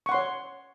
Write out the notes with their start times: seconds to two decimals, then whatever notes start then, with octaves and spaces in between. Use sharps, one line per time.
0.06 C#6
0.09 F#5
0.12 C6
0.14 C#5